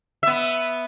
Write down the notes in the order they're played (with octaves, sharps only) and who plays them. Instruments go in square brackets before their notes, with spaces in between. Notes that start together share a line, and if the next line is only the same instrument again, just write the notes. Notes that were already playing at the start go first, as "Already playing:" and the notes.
[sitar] B3 E5